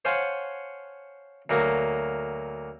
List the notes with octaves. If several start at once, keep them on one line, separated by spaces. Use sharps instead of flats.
C5 C#5 F5 F#5 G#5 A5
D2 F#3 A#3